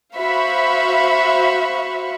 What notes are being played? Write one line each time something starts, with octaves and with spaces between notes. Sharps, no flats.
F#4 C5 E5 F5 B5 C#6